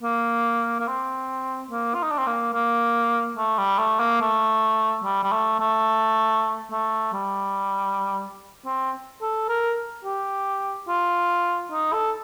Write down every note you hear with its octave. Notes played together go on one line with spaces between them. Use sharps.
A#3
A#3
C4
A#3
F4
D#4
D4
C4
A#3
A#3
A3
G3
A3
A#3
A3
G3
G3
A3
A3
A3
G3
C4
A4
A#4
G4
F4
D#4
A4